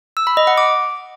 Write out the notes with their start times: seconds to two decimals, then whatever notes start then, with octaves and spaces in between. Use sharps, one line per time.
0.17 E6
0.27 B5
0.37 D#5
0.47 F#5
0.58 D6